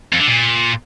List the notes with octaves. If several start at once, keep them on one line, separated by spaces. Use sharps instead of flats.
F2
D3
A#2